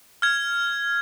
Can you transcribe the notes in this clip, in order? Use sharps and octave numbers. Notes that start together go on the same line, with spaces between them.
F6 G#6